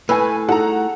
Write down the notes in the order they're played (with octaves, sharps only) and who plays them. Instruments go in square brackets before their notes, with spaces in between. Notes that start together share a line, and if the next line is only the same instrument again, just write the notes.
[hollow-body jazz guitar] A2 A3 [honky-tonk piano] B4 G#5
[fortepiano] D#4 G#4 A4 [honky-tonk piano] F#5 A#5